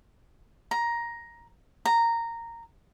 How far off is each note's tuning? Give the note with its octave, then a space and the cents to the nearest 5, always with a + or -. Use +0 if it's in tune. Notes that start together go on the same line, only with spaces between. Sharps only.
A#5 +10
A#5 -10